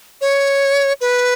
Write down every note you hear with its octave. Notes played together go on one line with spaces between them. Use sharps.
C#5
B4